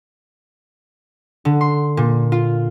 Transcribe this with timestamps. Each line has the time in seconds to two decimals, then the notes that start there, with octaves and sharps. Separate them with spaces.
1.45 D3
1.61 C6
1.97 A#2
2.32 F4